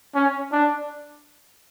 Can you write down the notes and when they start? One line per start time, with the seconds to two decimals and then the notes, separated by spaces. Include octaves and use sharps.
0.15 C#4
0.52 D4